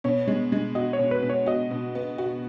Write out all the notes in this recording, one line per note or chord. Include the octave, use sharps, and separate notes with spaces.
B2 C#5
G#3
G#3
F#4 D#5
C#5
B2
B4
B2
C#5
F#4 D#5
B2
B3
F#4